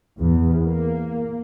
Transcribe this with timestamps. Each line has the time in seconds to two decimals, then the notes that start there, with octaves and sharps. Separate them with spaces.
0.18 E2
0.65 A#3